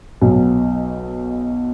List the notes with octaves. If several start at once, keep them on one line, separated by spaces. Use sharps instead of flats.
B1 B2 F#3